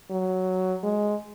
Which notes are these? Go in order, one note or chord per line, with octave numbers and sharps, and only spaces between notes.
F#3
G#3